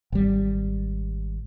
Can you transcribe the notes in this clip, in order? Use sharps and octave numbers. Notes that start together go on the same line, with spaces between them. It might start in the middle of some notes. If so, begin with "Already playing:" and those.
G#1 G3